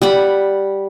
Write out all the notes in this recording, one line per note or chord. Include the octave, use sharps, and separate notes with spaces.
G3 F#5 B5